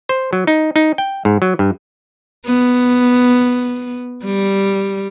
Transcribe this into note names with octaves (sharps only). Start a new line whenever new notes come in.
C5
F#3
D#4
D#4
G5
G#2
F#3
G2
B3
G3